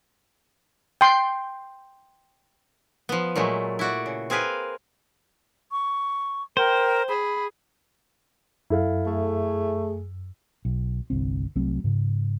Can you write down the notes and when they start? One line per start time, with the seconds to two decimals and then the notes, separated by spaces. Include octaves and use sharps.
1.01 G5 C6
3.09 F3 B3
3.36 A#2 F#3 G#3 A3
3.79 E4 F#4 D5
4.06 C#3
4.30 C4 G#4 A#4 B4 F5
5.72 C#6
6.57 A#4 C5 G5
7.09 G#4 B5
8.70 F#2 E4 A4 F5
9.06 A3 G#4
10.65 B1
11.10 G1 C2 C4
11.56 C2 F#3 A3 C4
11.84 G#2 C#3